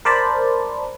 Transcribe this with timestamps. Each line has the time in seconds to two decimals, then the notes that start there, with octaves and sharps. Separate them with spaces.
0.05 A#4 C5 D5 A5 B5